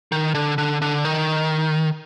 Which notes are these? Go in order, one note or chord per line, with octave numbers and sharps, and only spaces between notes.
D#3
D3
D3
D3
D#3